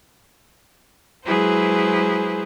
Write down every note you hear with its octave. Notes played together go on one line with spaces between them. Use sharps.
F#3 G#3 E4 G#4 B4 C5